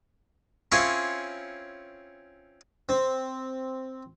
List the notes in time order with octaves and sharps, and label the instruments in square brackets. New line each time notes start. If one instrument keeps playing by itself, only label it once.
[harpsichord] C4 C#4 E4 F4 G#4 C#5
C4